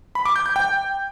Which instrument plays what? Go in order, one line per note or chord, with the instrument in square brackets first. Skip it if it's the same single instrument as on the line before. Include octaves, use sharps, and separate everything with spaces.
[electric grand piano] B5
D6
G6
G6
G5